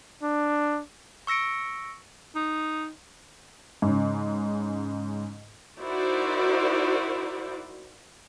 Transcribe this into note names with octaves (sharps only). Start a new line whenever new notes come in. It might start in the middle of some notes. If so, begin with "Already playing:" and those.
D4
C#6 E6 A#6 C#7 D7
D#4
G#2 C#3
D#4 E4 F#4 A#4 C5 D5